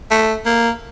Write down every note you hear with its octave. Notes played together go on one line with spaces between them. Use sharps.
A3
A#3